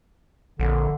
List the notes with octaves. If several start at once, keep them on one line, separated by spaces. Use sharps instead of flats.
A#1 D3